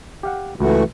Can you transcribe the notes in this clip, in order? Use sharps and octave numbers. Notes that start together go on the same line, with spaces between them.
G4 F5 F#5
C#2 E3 A3 F#4